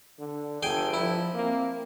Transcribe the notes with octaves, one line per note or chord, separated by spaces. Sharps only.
D3
G1 G#4 A4 G5
F3 E4
A#3 C4